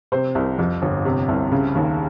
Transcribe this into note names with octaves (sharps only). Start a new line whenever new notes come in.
C3 C5
C2
F2
G1
C3
C2
C#3
D#2